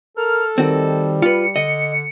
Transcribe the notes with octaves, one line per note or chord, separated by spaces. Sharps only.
A4 A#4 F6
D#3 G3 C4 F#4
F4 B4 C#7
D3 D#5